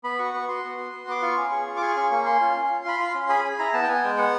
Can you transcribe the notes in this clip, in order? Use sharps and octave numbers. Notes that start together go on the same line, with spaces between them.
B3 B5
F#4 C#6
B3 C#6
F#4 C6
B3
F#4
B3
B3 D6
F4 C#6
C#4
G#4
F4
D6
G#4 C#6
C#4 C#6
A#3 C#6
C#4 C6
F4
C#4
F4
F4 B5
F4 C6
C#4
G#4 B5
G#4
E4 A#5
B3 A5
G5
B3 G#5
G#3 G5
B3 F#5